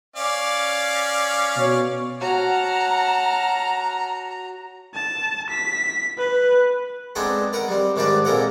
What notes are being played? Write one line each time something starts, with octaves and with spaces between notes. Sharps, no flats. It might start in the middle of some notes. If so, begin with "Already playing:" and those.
C#4 D5 F5
B2 C#5
F#4 C#5 F#5 A5 A#5 F6
A5
B6
B4
G#3 B3 C4 D4 D#4 A4
A#4 B4 F#5
G3 C4
G#2 D#3 G3 D4 B4 D5
A#2 G#3 C4 A4 A#4 F#5